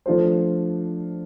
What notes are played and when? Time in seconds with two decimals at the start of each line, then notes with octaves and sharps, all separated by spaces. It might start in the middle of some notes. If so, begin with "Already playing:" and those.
0.06 F3 A3 D4 F4 C5